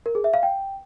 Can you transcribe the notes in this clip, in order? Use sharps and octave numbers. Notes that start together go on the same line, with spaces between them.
A#4
G#4
E5
F5
G5